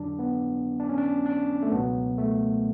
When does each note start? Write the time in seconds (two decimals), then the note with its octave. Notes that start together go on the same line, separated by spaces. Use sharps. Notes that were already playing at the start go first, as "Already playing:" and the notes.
Already playing: F2 D3 F#3 D4
0.19 B3
0.80 D4
0.89 C#4
0.98 D4
1.26 D4
1.62 A3
1.72 C#2 B2 F#3 B3
2.18 A3